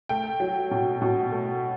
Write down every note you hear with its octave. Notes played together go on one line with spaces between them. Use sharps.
A3 G5
F#3
B2
B2
A3